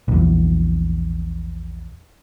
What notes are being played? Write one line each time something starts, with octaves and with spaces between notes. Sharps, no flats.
A#1 E2